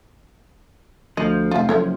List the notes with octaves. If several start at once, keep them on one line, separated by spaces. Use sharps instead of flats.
D2 F3 D#5
F1 F4 E5
F#1 A4 C#5 E5